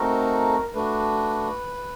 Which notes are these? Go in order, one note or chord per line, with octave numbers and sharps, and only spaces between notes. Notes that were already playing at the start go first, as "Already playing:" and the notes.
Already playing: A3 C4 D#4 F#4 A4 A#4
A3 D4 F#4 B4